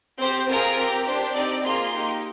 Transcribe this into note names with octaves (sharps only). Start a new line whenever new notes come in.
C4 G4 C5
C4 F4 G#4 A#4
C4 G4
D4 G4 C5
C4 D#4 G4 D5
A#3 F4 G#4 C6
A#3 D#4 G4